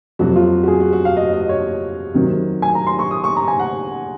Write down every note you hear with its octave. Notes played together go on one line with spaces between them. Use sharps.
F2 C3 F#3 F#4
F4
F#4
G#4
F#4
F#4
F5
D#5
D#5
C#5
C3 D#3 F#3
G#5
A#5
C6
C#6
D#6
C#6
A#5
G#5
F#5